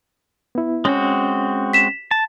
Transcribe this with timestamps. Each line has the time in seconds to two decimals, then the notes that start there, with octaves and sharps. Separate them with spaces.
0.55 B3 E4
0.85 G#3 C4 C#4 F#4
1.73 B6 E7
2.11 A5